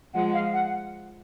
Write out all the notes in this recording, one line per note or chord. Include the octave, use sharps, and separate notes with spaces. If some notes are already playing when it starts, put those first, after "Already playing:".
F3 G#3 F#5
F5
F#5